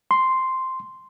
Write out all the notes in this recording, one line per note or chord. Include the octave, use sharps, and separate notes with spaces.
C6